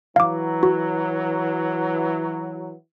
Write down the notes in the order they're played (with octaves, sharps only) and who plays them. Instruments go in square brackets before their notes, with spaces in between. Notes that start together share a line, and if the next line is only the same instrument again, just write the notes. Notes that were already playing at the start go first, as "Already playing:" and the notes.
[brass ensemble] E3 F#3 [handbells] F5 D6
[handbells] F#4